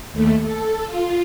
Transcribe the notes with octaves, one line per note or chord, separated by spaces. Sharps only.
D#2 A3
A4
F4